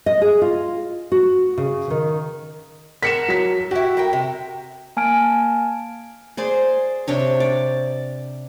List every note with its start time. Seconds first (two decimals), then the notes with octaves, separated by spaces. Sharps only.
0.06 D#5
0.22 G#4
0.42 F4
1.12 F#4
1.58 C#3
1.90 D#3
3.03 A#4 F#5 B6 C#7 E7
3.28 F#3 B6
3.71 E4 F#4 G4
3.97 G3 A#4 G5
4.13 C3
4.97 A#3 G#5 A5 F6 D7
6.37 G#4 C5 D5
7.08 C3 D4 C#5
7.40 D5